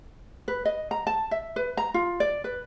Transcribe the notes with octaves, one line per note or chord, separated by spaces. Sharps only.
B4
D#5
A#5
A5
E5
B4
A#5
F4
D5
B4